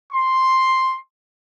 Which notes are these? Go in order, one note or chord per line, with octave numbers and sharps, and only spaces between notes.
C6